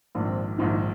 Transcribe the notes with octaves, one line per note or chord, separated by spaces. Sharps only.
A#1 G#2 D#3 D4
C4
D4
A#1 G#2 D#3 D#4
D#4